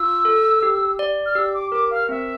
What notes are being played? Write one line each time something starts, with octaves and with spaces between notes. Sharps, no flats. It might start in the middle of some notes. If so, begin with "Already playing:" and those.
Already playing: F4 E6
A4
G4
D5
F6
G4 E6
D6
A#4 D6
F5
C4 E5